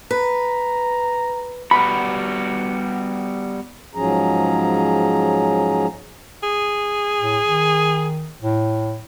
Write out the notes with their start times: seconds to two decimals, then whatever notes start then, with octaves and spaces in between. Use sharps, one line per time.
0.11 B4 A#5
1.71 G3 B3 F#4 B5
3.95 G#2 F3 F#3 C#4 G#4 A#5
6.43 G#4
7.20 A2
7.45 D#3
8.42 A2